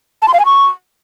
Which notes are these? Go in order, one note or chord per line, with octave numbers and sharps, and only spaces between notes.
A5
C6
F5
G#5
C#6